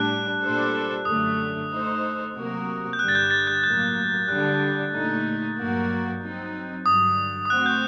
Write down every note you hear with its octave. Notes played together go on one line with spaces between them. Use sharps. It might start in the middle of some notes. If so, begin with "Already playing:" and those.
Already playing: A2 G3 D4 F#6
A#2 G3 D4 A4 C5
F#2 D3 A3 D#6
A3 D#4 A4 C5
C3 F#3 A#3 F#4 A#4
G6
G2 D3 G3 F#6
A6
G6
A6
G6
A2 F#3 A#3 G6
D3 G3 D4 F#6
A#2 A3 D#4
G2 F#3 A#3 F#4 A#4
F#3 C4 D#4
G2 D3 F#3 D#6
D#6
A3 C4 F#4 C5 F#6
G6